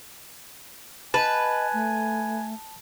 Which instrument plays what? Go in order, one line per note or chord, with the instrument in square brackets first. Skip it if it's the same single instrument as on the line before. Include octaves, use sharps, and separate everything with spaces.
[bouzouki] B4 [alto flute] D#5 [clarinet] G#5 [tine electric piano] A5
[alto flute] A3